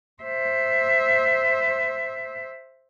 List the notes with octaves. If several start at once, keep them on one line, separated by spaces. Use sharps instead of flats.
C5 E5